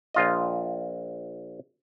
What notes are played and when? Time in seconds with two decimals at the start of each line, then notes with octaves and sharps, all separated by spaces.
0.14 A#1 F4 D#5